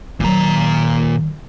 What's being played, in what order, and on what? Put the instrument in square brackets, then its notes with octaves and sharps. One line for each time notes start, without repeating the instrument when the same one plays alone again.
[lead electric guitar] A#2 A#5 [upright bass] D#3 F#3